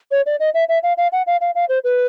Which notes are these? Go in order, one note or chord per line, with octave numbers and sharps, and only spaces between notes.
C#5
D5
D#5
E5
E5
F5
F5
F#5
F5
F5
F5
C5
B4